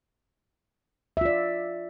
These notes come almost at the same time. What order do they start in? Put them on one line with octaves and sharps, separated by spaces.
E5 F4 D5